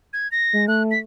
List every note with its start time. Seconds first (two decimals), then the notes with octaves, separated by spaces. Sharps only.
0.13 G#6
0.32 A#6
0.53 G#3
0.68 A3 F#6
0.91 B6